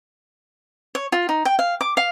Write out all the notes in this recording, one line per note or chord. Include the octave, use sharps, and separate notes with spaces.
C#5
F4
D#4
G5
F5
D6
F5